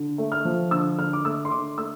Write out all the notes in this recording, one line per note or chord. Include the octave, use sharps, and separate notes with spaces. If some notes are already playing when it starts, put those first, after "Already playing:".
Already playing: D3
A3
F6
F3
D3 E6
D3 F6
D6
A3 E6
C6
D3 D6
A3 E6